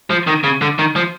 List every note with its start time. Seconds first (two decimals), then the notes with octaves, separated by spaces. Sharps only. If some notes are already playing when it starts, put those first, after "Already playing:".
0.10 F3
0.27 D#3
0.44 C#3
0.62 D3
0.79 D#3
0.96 F3